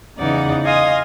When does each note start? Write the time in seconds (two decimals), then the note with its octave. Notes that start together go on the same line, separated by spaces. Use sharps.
0.18 E2 C#3 E3 D#4 D5 F#5
0.63 D#5 F5 G#5 C6 D#6